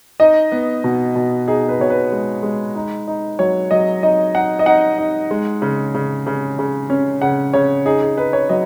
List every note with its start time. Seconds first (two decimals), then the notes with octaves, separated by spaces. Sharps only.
0.20 D#4 D#5
0.52 B3
0.84 B2
1.15 B2
1.47 D#4 G#4
1.69 B4
1.80 B2 C#5
1.90 B4
2.12 G#3
2.43 G#3
2.75 D#4
3.08 D#4
3.39 F#3 C#5
3.71 F#3 D#5
4.03 D#4 D#5
4.35 D#4 F#5
4.59 D#5
4.66 D#4 F#5
4.98 D#4
5.31 G#3
5.62 C#3
5.95 C#3
6.27 C#3
6.59 C#3
6.90 C#4
7.22 C#3 F#5
7.54 C#3 C#5
7.85 D#4 G#4
8.02 G#4
8.17 D#4 B4
8.33 C#5
8.49 F#3 D#5